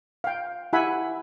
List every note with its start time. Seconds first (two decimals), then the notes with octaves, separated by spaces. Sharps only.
0.24 F5 G5
0.73 E4 G4 E5 F#5 G#5 B5